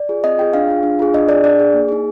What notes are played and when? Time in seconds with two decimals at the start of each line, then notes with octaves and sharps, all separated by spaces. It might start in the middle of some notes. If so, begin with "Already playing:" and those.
Already playing: D5
0.09 F4 G#4
0.24 C4 D#5
0.38 F4 G#4 G5
0.53 D4 F5
0.68 F4 G#4
0.83 D4
0.99 F4 G#4
1.14 D4 D#5
1.29 G#4 D5
1.44 D4 D5
1.59 G#4
1.74 A#3
1.88 D#4 G#4